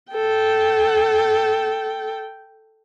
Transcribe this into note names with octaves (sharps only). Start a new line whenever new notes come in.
A4 G5